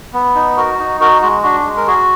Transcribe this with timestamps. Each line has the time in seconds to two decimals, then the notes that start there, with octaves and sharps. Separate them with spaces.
0.13 B3
0.35 D#4
0.57 F#4 A#4
0.79 D#4
1.01 F#4 A#4
1.22 G#3 F#4
1.43 D4 F#4
1.65 G#3
1.77 A#4
1.87 F#4 G#4